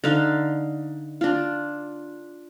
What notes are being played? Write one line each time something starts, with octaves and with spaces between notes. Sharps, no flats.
D3 D#4 F5
D4 F4